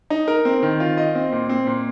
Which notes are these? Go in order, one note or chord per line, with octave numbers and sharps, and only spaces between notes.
D#4
A#4
C4
D#3
F4
D#5
C4
A#2
C4
A#2